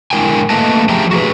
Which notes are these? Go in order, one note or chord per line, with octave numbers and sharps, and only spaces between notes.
D3 G#3 E4 A#4 G5 G#5
A3 A#3 B4 D#5 A5
F3 G4 G#4 E5 G5 A#5
F#4 G#4 B4